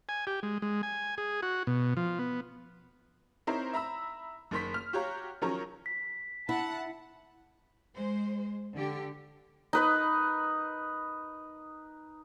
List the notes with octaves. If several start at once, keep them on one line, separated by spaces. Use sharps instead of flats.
G#5
G4
G#3
G#3
G#5
G#4
F#4
B2
F3
B3
C4 D#4 E4 A#4 C5 C#5
E5 A#5 B5 E6
F#1 D#3 C6 B6
F6
F#4 G4 C#5 F5 A#5
D#3 F3 F#3 C#4 A#4 C#5
B6
E4 F#5 A5
G#3 C5
D3 G4
D#4 B4 D#5